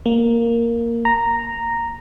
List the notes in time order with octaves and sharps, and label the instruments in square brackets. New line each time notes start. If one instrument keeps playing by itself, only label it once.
[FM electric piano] A#3
A#5